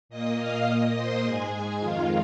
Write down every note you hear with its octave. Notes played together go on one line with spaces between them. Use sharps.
A#2 A#3 D#5 D#6
F5 F6
A#2 A#3 D#5 D#6
C5 C6
G#2 G#3 G#4 G#5
F2 D#3 G#3 F4 F5